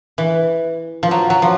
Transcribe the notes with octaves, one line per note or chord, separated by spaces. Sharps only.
E3
F3
F#3
F#3
F3